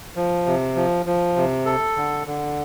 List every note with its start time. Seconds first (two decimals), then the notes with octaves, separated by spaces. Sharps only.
0.16 F3
0.46 C3
0.76 F3
1.06 F3
1.36 C3
1.66 A4
1.97 D3
2.27 D3